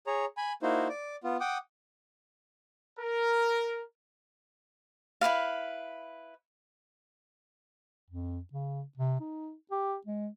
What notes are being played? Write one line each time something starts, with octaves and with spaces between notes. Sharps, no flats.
G#4 C#5 A#5
G#5 B5
A#3 D#4 E4 F#4 C5
D5 D6
B3 F4
F#5 G5 D6 D#6
A#4
E4 F#4 B4 F5
F2
C#3
C3
D#4
G4
G#3